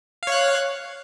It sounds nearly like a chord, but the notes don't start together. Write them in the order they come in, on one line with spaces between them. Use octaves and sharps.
F5 C#5 F#6